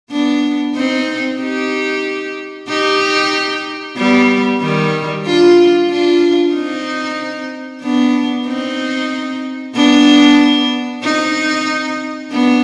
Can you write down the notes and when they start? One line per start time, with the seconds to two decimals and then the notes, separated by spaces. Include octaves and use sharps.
0.11 B3 D4
0.75 C4 D#4
1.39 D#4 G4
2.69 D#4 G4
3.96 G3 B3
4.62 D#3 G3
5.25 D4 F4
5.90 D4 F4
6.54 C4 D#4
7.82 B3 D4
8.46 C4 D#4
9.75 B3 D4
11.03 C4 D#4
12.32 B3 D4